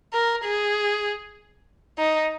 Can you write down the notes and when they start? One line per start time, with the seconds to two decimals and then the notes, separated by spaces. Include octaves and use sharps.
0.14 A#4
0.44 G#4
1.98 D#4